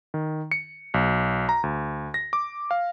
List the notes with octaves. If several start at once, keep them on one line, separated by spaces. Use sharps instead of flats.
D#3
C#7
B1
A#5
D2
A#6
D6
F5